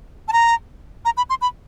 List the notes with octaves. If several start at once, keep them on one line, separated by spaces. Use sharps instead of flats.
A5
A#5
A#5
B5
C6
B5